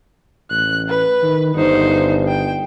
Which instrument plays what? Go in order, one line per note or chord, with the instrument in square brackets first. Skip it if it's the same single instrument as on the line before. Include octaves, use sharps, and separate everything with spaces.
[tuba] A1 [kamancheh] F#6
[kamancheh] B4
[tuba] D#3
[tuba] G1 [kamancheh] D#4 C5
[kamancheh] G5